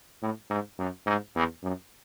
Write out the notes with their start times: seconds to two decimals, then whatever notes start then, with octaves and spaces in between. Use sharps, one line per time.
0.21 A2
0.50 G#2
0.79 F#2
1.06 G#2
1.35 E2
1.63 F#2